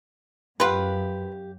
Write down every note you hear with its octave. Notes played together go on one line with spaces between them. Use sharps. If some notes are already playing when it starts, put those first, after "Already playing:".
F#2 F4 G4 B4 F5 F#5